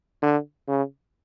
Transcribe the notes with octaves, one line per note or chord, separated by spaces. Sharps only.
D3
C#3